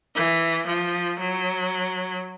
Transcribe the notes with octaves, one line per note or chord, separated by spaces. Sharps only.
E3
F3
F#3